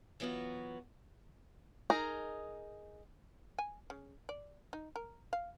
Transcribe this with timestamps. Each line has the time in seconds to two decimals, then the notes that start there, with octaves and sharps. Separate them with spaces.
0.20 E3 F#3 B3 F4 F#4
1.90 D#4 G#4 A#4
3.59 G#5
3.90 C#3
4.29 D5
4.73 D#4
4.96 A#4
5.33 F5